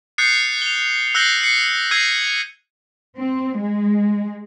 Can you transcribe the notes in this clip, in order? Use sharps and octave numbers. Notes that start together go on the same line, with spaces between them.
D#6 F#6 G6 A6 C7 C#7
F7 G7
E6 F#6 G6 A#6 C7 G7
C7 C#7
E6 F#6 G#6 A#6 C7 D#7
C4
G#3